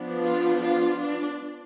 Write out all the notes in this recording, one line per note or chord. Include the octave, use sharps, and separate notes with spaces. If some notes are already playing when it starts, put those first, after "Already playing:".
Already playing: F3 B3 D4
F4
F4
D4